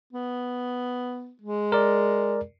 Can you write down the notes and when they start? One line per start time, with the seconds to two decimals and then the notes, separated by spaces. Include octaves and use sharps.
0.13 B3
1.42 G#3
1.72 A#4 D5